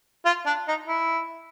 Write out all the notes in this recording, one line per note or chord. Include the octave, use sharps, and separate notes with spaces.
F4
D4
D#4
E4